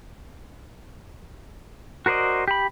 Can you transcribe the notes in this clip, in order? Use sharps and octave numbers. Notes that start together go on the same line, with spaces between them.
F#4 A#4 C5 D5 D#5
G4 B5